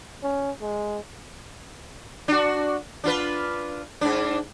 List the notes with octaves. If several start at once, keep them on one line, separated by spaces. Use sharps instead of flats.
C#4
G#3
D4 F#4
D4 F4 B4
G#2 D4